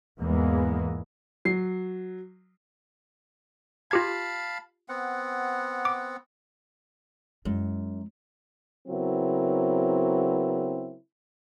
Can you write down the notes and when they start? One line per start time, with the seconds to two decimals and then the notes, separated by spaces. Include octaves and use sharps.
0.21 E2 G#2 E3 G#3 A#3 B3
1.45 F#3 C7
3.91 F4 G4 F5 A5 B5 G#6
4.89 B3 C4 F#5
5.85 D6
7.45 F#2 G#3 E4
8.88 C#3 F#3 B3 C4 E4 A#4